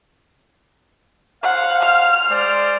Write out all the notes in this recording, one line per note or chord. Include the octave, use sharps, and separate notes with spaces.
C5 F5 F#5
F6
G#3 C5 D5